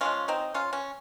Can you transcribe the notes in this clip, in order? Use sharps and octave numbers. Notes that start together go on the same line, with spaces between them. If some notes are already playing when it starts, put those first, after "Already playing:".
C#3 F3 G#3 C#4 F4
C4 D#4
C#4 F4
C#4